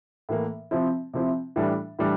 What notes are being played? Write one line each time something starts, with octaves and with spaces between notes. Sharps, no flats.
A2 E3 A#3
C3 F3 C4 E4
C3 F3 C4 E4
A2 E3 G3 D4
A2 E3 G3 D4